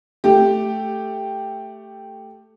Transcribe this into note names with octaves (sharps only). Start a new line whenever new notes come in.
A3 G4